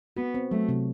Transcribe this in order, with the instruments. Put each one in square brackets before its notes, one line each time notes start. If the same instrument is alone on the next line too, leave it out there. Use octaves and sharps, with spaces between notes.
[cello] B3 [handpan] F#4
[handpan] C4
[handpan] F#3 [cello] A3
[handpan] C3